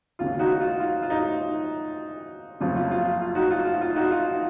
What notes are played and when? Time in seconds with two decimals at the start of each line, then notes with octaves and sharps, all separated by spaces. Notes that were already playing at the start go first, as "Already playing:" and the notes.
0.19 D#2 C#3 F4
0.39 D#4 F#4
0.60 F4
0.80 F4
1.02 F4
1.10 D#4
2.60 F#1 F2 C#3 F4
2.76 F4
2.91 F4
3.21 F4
3.35 D#4 F#4
3.50 F4
3.65 F4
3.81 F4
3.96 D#4 F#4
4.11 F4